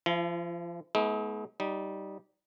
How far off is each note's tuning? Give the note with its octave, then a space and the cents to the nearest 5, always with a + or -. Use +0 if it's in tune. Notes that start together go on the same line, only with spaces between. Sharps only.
F3 -25 E4 +40
G#3 +45 B3 -10 D#4 +45
G3 -15 D#4 +0